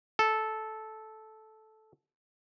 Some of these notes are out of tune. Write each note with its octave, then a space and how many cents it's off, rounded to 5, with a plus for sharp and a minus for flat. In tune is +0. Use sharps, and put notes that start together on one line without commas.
A4 -10